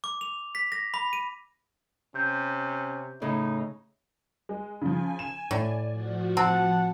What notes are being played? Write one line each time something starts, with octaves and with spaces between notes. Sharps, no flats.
D6
F7
B6
A#6
B5
D#7
C3 C#4 G6
A2 C#3 D#4
G#3
C#3 F3 G#5
E7
A2 D5
F3 F#4
C4 F#5 A5